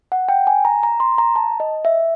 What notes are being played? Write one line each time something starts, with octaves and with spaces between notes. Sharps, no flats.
F#5
G5
G#5
A#5
A#5
C6
A#5
A5
D#5
E5